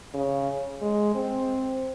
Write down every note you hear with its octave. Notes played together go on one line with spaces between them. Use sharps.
C#3
G#3
C4